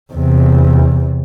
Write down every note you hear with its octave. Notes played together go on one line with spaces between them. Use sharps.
E2 C3